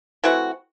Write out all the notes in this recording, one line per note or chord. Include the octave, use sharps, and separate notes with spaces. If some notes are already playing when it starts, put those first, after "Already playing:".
E3 A3 C4 F#4